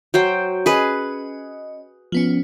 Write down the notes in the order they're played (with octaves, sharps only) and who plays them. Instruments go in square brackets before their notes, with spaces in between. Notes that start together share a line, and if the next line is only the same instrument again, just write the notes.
[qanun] F#3 C5 G5
[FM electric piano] C#4 D#5 [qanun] G#4 B4
[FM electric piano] F3 B3 C#4